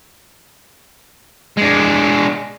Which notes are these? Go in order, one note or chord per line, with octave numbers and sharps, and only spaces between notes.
G#3 D4